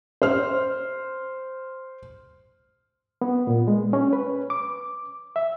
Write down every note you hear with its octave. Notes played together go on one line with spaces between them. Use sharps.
C5 F6
B3
A#2
G#3
C#4
B4
D6
E5